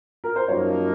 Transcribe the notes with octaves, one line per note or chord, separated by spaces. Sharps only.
A#4
C5
F#2 F3 A#3 D#4 A#4 C#5